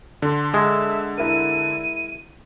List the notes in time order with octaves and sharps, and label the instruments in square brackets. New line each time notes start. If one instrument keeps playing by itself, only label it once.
[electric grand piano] D3 [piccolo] C6
[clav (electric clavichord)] G#3 [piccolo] E5
[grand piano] E4 A#4 [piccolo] D#7